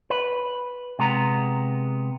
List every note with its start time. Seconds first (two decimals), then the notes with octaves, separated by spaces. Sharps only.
0.10 B4
0.99 C3 G#3 B3 A#5